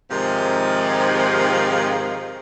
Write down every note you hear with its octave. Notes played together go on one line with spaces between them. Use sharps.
G#2 C3 D#3 F3